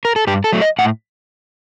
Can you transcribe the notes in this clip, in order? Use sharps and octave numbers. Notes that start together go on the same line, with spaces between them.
A#4
A4
G2 G4
A4
F#3 A3
D#5
A2 F#5